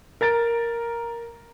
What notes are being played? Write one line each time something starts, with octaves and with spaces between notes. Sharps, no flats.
A#4 A#5 A6 D7